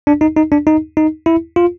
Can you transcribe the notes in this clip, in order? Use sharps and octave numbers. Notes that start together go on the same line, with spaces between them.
D4
D#4
D#4
D4
D#4
D#4
E4
F4